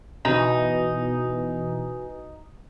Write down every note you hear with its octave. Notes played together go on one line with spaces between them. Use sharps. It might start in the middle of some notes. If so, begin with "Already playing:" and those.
B2 E3 D#4 F#4 B4 G#5